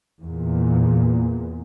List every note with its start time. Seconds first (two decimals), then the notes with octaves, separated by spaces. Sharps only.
0.22 E2 A#2